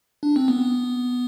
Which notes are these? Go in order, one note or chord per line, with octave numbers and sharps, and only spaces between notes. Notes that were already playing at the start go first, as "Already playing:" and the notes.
D4
C4
B3